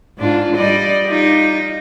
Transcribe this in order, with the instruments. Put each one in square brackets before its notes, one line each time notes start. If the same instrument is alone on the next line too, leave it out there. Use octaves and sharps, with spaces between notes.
[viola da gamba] G#2 D4 F4
G3 D5 D#5
D#4 F4 G4